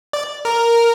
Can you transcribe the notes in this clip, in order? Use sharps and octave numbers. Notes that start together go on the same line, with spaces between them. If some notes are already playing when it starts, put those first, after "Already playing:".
D5
A#4